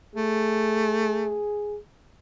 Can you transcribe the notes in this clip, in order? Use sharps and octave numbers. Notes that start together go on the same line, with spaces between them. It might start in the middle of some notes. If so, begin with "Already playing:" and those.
A3 G#4